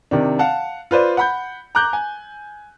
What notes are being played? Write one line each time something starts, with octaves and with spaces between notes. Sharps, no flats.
C3 D#3 D4
F5 F#5 A5
F4 B4 C5 D5
F#5 B5 G6
A#5 D6 F#6 G6
G#5